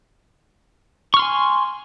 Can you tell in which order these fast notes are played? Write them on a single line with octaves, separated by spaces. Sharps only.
C#6 F6 C6 G#5